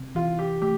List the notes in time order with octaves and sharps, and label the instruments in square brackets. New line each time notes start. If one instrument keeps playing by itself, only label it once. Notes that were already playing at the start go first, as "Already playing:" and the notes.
Already playing: [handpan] C3
[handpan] E3 [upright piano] F4
[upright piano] G4
[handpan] A3 [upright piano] G4